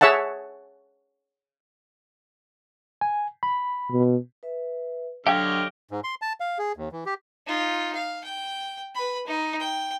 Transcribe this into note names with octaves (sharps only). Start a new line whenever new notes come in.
G#4 C#5 E5 F#5 A5
G#5
B5
B2
B4 E5
D3 F#3 G4 C#5 D#5 F5 G5 F6
G#2
C6
A5
F5
G#4
D#2
E3
G4
D#4 F4
F5
G5
B4 B5
D#4
G5